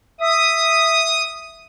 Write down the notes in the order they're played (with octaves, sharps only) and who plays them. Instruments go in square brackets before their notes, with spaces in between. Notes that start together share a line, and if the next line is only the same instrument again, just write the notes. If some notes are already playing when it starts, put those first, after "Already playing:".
[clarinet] E5 [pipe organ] D#6